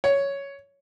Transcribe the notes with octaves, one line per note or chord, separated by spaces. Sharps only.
C#5